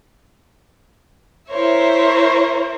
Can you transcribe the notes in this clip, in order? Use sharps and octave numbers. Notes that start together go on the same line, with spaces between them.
E4 A#4 C5 C#5 E5